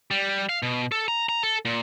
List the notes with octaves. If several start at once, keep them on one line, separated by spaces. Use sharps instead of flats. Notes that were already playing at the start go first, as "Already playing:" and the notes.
G3
F5
B2
A4
A#5
A#5
A4
A#2